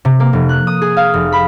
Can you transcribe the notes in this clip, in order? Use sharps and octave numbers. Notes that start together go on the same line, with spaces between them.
C3
A#3
F1
F#6
D#6
G#4
F5
F1
B5